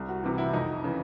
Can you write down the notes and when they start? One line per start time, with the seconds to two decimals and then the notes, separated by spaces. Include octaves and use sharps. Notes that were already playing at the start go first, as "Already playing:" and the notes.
Already playing: C2
0.09 F#4
0.23 C3 E3 F#4
0.38 E4
0.53 F2 D#4
0.84 C#3 E3